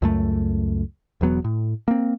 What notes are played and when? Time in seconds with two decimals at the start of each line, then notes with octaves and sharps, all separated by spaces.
0.02 C#2 F#2 A3
1.21 E1 E2 F#3 B3
1.44 A2
1.88 A#3 C4